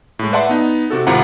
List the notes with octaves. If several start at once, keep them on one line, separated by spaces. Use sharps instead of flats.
A2 G#3
B4 D5 E5 F#5 A5 C6
B3 D#4
C3 F#4 A4
G#1 C3 E4 F4 F#5 A#5